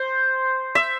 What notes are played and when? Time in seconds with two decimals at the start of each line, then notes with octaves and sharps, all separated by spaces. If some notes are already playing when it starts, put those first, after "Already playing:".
Already playing: C5
0.75 E5